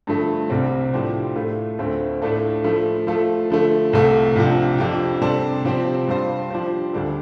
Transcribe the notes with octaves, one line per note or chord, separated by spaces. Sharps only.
G2 D3 F3 A3
C2 C3 G3 C4
A2 F3 D4 G4 C5
A2 A3 F4
D2 D3 A3 C4 F4
A2 A3 D4 F4 A4
F3 A3 F4 A4
F3 A3 F4 A4
D3 F3 A3
C2 C3 A3 F4 A4
C2 C3 F3 D4
F2 F3 D4 G4
C3 G3 D4 A4 C5
C3 F3 C4 G4 C5
G2 G3 F4 C5
F3 D4 G4 C5
D2 D3 G3 D4 A4